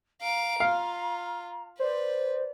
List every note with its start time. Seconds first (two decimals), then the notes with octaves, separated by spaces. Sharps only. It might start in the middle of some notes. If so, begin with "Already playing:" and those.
0.22 F5 A#5 D7
0.60 F4 F5
1.80 B4 C5 D5